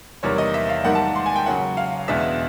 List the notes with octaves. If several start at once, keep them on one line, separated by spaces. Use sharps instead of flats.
E2 C3 D#3 G3 A#3 C#5
D#5
E5
F5
G#2 D#3 G3 A#3 F#5
A5
C6
G#5
G5
C#3 F#3 A#3 F#5
F5
E2 B2 G#3 B3 D4 E5